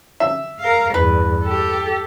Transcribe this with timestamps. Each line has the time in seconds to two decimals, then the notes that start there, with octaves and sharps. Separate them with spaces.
0.20 E5
0.59 A#4 F5
0.94 E2 G2 B4
1.43 G4 A4